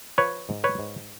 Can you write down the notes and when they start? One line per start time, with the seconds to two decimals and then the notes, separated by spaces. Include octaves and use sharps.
0.18 F3 B4 C#5
0.49 G#2
0.64 B4 C#5
0.79 G#2